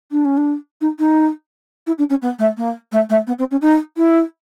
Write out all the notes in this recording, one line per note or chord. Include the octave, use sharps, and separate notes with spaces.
D4
C#4
D4
D#4
D#4
E4
D4
C#4
B3
A3
A#3
A3
A3
B3
C4
C#4
D#4
E4